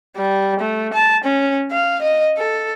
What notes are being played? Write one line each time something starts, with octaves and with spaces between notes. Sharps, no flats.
G3
A3
A5
C#4
F5
D#5
A4